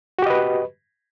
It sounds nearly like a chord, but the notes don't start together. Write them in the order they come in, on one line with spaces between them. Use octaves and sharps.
F#4 G4 D#5 B4